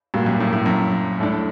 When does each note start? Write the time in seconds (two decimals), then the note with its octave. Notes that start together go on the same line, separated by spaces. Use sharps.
0.14 G2 A#2 G3 A#3 F#4
0.26 F#2
0.40 A2
0.53 A2
0.66 F#2
1.19 A2 A3 D4